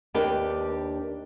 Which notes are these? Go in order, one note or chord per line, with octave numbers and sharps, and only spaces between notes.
D#2 D4 G4 A#4 B4 G5